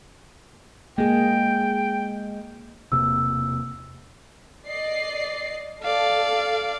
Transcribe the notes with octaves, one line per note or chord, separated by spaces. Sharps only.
G#3 A#3 G#4 G5
E1 C3 A#3 E6
D5 D#5 C7
A4 D5 F5